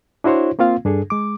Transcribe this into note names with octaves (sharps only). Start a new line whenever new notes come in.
D4 E4 F#4 C5 C#5
A#3 C4 F4 F5
G2 D4 G#4 A4
G#3 D6